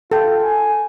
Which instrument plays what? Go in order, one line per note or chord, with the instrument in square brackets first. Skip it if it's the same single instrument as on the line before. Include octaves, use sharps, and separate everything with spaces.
[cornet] F4 [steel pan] A4 G5
[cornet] G#5